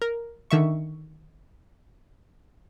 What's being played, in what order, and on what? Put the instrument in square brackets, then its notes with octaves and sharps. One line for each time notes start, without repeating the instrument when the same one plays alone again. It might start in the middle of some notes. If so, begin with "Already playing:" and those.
[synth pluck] A#4
D3 D#3 E5 C#6